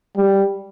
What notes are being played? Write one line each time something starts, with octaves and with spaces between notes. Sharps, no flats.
G3